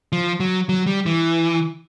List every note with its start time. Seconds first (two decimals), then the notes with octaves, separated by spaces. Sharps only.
0.12 F3
0.40 F#3
0.69 F#3
0.86 G3
1.06 E3